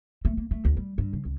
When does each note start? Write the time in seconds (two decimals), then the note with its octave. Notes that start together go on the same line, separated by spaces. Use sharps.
0.25 A3
0.37 A#3
0.51 A3
0.65 D2
0.77 G3
0.98 G2
1.13 C#3
1.25 C#2